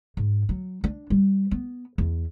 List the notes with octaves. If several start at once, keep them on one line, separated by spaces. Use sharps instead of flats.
G#2
F#3
D4
G3
B3
E2